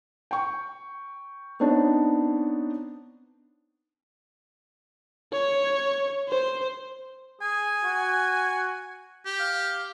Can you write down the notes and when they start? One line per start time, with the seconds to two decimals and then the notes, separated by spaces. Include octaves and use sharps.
0.31 G5 C#6
1.60 B3 C4 D4 D#4 C#5
5.33 C#5
6.29 C5
7.41 G#4 G#5
7.84 F#4
9.25 G4
9.39 F5